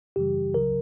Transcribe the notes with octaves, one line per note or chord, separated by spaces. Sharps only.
F#2 C#3 E3 G3 G4
C#2 C#3 F#3 A#4